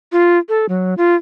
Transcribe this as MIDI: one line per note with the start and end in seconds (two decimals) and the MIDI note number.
0.12 0.38 65
0.49 0.66 69
0.69 0.94 54
0.98 1.16 65